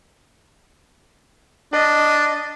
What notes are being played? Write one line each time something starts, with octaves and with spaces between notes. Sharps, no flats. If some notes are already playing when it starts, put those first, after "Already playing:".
D4 D#5